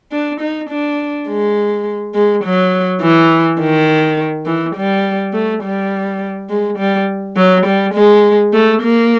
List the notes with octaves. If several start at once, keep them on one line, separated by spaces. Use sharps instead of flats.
D4
D#4
D4
G#3
G#3
F#3
E3
D#3
E3
G3
A3
G3
G#3
G3
F#3
G3
G#3
A3
A#3